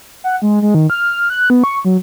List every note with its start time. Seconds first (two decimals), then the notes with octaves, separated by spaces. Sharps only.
0.24 F#5
0.42 G#3
0.62 G#3
0.75 D#3
0.90 F6
1.30 F#6
1.50 B3
1.64 C#6
1.85 F#3